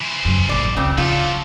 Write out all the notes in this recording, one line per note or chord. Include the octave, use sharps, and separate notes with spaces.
E3 C5
F#2 C#3
E1 A1 D5
C#2 C#3 A#3 C4
C#3 E3 F#3 F4 A4